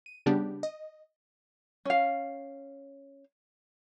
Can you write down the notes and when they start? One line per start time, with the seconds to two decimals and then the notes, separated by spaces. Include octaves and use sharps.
0.06 D#7
0.26 C#3 G3 B3 D4 G4
0.63 D#5
1.85 C#4 F5